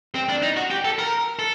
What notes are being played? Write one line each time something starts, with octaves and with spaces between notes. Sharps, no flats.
C4
D4
D#4
F#4
G4
A4
A#4
A4